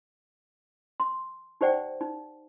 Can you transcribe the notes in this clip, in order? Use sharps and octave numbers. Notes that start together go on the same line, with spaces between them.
C6
D#4 G4 C5 D5 F#5 G5
D#4